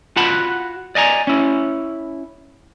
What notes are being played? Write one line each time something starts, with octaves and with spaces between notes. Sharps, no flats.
F4 F#4 F#5 A5 B5
D5 D#5 G#5 A#5
C#4 E4